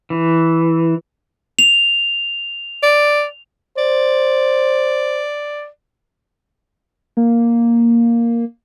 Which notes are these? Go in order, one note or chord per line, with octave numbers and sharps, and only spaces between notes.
E3
F7
D5
C5 D5
A#3